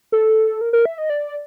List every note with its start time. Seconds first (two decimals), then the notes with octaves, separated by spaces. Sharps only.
0.12 A4
0.61 A#4
0.73 A#4
0.85 E5
0.98 D#5
1.10 D5